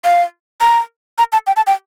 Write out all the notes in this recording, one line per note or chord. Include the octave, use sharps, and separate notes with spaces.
F5
A#5
A#5
A5
G5
A5
G5